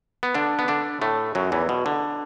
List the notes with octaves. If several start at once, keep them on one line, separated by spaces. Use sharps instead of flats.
B3
D3 D4
B3
D3 D4
A2 A3
F#2 F#3
E2 E3
B2
D3